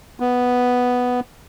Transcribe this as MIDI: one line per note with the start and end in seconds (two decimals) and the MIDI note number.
0.20 1.20 59